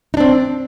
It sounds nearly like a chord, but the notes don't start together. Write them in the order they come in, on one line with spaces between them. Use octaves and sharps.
D#4 D4 C4